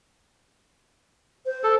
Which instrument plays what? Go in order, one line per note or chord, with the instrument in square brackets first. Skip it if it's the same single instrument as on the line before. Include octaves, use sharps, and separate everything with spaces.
[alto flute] C5
[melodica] A4